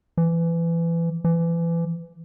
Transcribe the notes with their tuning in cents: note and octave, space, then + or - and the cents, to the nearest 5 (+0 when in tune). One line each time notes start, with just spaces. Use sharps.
E3 +25
E3 +30